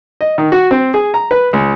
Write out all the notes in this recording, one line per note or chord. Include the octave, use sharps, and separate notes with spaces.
D#5
D#3
F#4
C4
G#4
A#5
B4
C#2